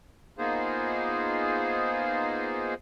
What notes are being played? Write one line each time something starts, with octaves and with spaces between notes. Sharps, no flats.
A#3 B3 D#4 F4 G#4 C5